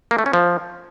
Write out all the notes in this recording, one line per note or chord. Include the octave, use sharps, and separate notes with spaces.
A#3
A3
C#4
F3